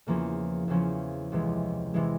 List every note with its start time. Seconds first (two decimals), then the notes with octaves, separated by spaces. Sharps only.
0.07 E2 C#3 F3 A#3 C#4
0.68 E2 C#3 F3 A#3 C#4
1.32 C#2 C3 E3 G#3
1.94 C3 E3 G#3